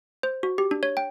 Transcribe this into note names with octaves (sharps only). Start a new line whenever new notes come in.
C5
F#4
G4
D4
C#5
G5